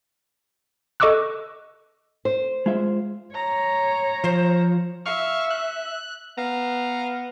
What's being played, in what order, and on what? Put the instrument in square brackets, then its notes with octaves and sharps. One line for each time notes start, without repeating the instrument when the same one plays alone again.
[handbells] A4 D#5 C#6 D6 E6 F#6
[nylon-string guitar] C5
[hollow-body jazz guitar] G#3 F4 E5
[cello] C#5 [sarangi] A#5
[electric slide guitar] F3 [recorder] C5
[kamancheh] E5 E6 [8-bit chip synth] F5 C#6 F6
[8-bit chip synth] F#6
[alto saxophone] B3 [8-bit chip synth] F5 A#5